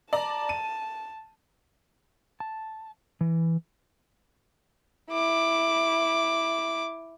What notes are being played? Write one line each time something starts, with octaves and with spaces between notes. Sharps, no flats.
D5 A5 A#5
D#7
A5
E3
E4 D6